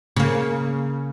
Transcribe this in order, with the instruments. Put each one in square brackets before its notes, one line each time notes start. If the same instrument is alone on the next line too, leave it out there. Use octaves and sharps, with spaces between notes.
[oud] C#3 A#3